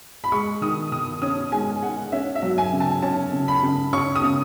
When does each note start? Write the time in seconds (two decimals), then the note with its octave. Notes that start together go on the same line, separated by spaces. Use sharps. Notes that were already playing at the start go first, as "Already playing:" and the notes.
0.24 B5
0.32 G#3 C#6
0.62 D#3 D#6
0.92 D#3 D#6
1.22 C#4 D#6
1.52 G#3 G#5
1.82 G#3 F#5
2.12 C#4 E5
2.35 E5
2.43 F#3
2.58 G#5
2.73 C#3
2.80 A5
3.02 C#4 A5
3.33 C#3
3.48 B5
3.63 C#3
3.93 C#4 C#6
4.16 D#6
4.23 C#3